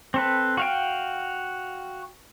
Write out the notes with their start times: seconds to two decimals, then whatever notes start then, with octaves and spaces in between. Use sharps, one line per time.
0.14 C4 A4 B4
0.57 F#4 F5 G5